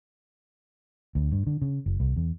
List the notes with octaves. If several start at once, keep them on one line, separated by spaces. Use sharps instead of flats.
D2
G2
D3
C#3
F#1
C2
E2